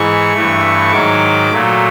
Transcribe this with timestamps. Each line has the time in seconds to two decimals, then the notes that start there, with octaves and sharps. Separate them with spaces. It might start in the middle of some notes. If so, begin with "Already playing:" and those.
Already playing: G#2 E3 G#3 C#6
0.33 G2 E3 A3
0.92 G#2 D#3 F#3 D6
1.51 A#2 F#3 A3